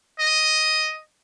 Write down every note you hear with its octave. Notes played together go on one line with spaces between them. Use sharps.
D#5